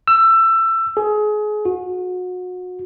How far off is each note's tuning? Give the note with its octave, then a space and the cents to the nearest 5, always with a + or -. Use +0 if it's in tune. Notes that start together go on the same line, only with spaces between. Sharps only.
E6 +20
G#4 +30
F#4 -30